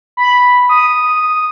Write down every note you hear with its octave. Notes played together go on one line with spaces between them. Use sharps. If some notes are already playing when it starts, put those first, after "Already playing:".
B5
D#6